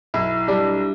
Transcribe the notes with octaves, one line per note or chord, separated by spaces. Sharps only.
B1 E4
G3 D4